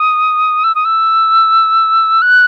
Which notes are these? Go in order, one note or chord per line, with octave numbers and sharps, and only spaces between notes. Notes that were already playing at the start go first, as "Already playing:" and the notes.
Already playing: D#6
E6
D#6
E6
F#6